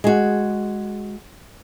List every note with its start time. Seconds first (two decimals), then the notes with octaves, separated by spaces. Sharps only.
0.04 G#3 F#4